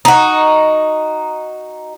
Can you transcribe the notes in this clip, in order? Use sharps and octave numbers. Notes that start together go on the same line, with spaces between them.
D#4 F#4